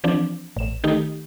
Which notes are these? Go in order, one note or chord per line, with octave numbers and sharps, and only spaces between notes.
E3 F3 C4 D4
A1 E7
D#3 A3 D#4 G4